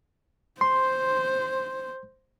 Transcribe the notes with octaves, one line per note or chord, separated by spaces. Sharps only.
C5 C6